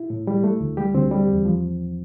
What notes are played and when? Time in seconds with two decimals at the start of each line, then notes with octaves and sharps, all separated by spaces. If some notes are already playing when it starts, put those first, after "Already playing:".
Already playing: E4
0.10 A2
0.27 G3
0.44 A3
0.60 D2
0.77 G3 G4
0.94 D2 C4
1.11 G3
1.28 E2
1.45 F3